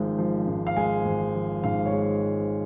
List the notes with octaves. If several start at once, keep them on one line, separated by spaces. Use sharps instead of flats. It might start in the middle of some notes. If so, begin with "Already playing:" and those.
Already playing: G#1 G#2 F3 G#3
F3
G#2
F5
G#3 G#5
G#1
F3
G#2 F5
C#5
G#3